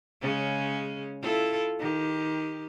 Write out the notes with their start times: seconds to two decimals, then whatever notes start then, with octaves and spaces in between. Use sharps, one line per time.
0.22 C#3 G#3 C#4
1.22 E4 F4 A4
1.79 D#3 G4